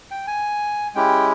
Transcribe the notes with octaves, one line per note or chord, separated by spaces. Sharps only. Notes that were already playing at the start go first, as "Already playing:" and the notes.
G5
G#5
G#3 C#4 E4 G4 G5